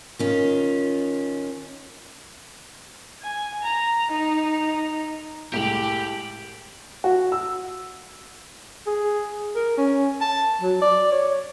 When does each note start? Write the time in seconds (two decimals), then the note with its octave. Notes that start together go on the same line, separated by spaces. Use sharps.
0.19 D#3 C#4 F4
3.22 G#5
3.63 A#5
4.12 D#4
5.53 C2 A2 G#3 G4 G5 D7 F#7
7.04 F#4
7.32 E6
8.87 G#4
9.56 A#4
9.78 C#4
10.21 A5
10.62 F#3
10.82 D5
11.12 C#5